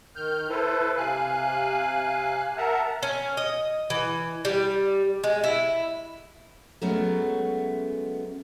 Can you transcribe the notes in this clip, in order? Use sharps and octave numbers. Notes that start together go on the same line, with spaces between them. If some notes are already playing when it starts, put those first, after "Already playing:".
D#3 F6 G6
E4 A4 B4 C5
C3 F5 G#5 F#6
A#4 E5 F#5 A5 A#5
C#4
D#5
E3
G3
G#3
E4
F#3 G#3 A3 B3 C#4